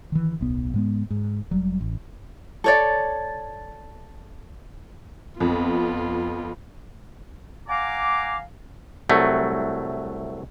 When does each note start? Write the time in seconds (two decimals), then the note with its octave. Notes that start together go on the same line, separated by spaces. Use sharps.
0.12 D#3 E3
0.40 D1 B1 B3
0.74 G#2 G#3 B3
1.10 G#2
1.51 F1 F#3 G3
1.81 A1
2.64 A4 C#5 D5
5.40 F2 B3 F4
7.67 F5 F#5 G#5 A#5 D6
9.09 C2 F#3 A3